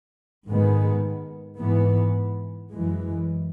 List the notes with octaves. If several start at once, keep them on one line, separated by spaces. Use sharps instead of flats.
G#2 D#3 G#3 B3
G#2 E3 B3
F#2 E3 G#3